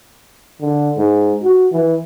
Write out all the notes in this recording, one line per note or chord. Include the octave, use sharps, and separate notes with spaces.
D3
G#2
F#4
E3